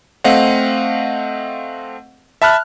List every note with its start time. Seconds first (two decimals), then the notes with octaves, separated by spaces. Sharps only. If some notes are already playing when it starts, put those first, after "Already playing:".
0.24 A3 C4 D#5 F5 F#5
2.42 E5 A5 B5 F6 F#6